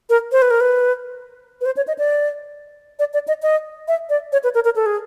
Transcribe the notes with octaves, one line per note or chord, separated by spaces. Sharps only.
A#4
C5
B4
A#4
B4
B4
C5
C#5
D#5
D5
D5
D5
D#5
D#5
E5
D5
C#5
B4
A#4
A#4
A4
G#4